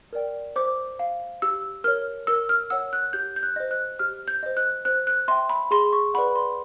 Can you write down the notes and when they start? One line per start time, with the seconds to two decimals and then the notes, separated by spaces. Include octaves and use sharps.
0.13 A#4 D5 G5
0.56 C5 D6
0.99 F5
1.42 G4 E6
1.84 A#4 C#5 F6
2.27 A#4 E6
2.49 F6
2.70 C#5 F#5 E6
2.93 F#6
3.13 G4 G6
3.36 G6
3.43 F#6
3.56 C5 D#5
3.71 F#6
3.99 G4 F6
4.28 G6
4.43 C5 D#5
4.57 F#6
4.85 C5 F#6
5.07 F#6
5.28 E5 G5 C6
5.50 B5
5.71 G#4 C6
5.93 C#6
6.14 B4 D5 F#5 B5
6.35 C6